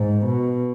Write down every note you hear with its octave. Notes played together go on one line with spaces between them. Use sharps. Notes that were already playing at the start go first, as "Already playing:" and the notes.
Already playing: G#2
B2